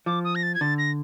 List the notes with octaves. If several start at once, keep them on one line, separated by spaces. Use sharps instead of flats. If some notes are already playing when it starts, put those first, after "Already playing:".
F3 D6
D#6
A#6
A6
G#6
D3 A6
A#6